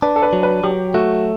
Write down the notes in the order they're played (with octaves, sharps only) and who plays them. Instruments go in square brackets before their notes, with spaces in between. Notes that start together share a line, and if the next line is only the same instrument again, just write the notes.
[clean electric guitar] D4 [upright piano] B4
[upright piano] A4
B4
[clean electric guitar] F#3
[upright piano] B4
[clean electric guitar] F#3 [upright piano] G4
[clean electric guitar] A3 [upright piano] F#4